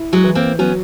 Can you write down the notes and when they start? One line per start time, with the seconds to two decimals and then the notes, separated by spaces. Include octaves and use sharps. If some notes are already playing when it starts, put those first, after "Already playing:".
Already playing: E4
0.13 F#3 G#3
0.24 E3
0.35 A#3 C4
0.59 F#3 B3 C#4